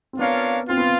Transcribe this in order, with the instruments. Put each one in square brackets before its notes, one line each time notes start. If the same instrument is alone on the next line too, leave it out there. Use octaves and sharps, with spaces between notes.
[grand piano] C4
[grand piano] B3 [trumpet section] D4 F4 A#4 C#5 F5
[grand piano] C4 [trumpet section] F4
[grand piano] B3